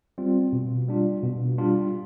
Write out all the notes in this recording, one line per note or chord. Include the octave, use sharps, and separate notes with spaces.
G3 C4 F4
B2
G3 D4 F4
B2
G3 D4 F4